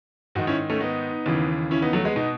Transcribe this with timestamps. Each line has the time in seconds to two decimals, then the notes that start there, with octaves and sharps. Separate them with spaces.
0.35 G#2 D#4 F#4
0.39 D#3
0.47 C#4 E4
0.70 A3 C#4
0.80 B3 D#4
1.26 D#2 C#3 E3
1.71 C#4 E4
1.82 B3 D#4
1.93 F#3 A3
2.05 G#3 B3
2.16 B2 B3 D#4